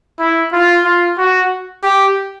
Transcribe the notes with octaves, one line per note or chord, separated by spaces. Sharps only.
E4
F4
F4
F#4
G4